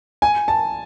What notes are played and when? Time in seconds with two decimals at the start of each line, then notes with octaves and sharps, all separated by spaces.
0.22 G#5
0.48 A5